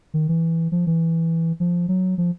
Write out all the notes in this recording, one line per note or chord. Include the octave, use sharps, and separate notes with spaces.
D#3
E3
F3
E3
F3
F#3
F3